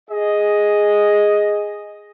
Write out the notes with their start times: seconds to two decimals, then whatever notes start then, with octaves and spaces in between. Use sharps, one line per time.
0.10 G#4 D#5